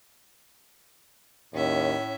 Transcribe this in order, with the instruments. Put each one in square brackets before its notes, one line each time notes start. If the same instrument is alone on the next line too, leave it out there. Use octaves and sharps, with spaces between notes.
[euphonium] D#2 [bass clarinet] A2 [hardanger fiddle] C#4 E5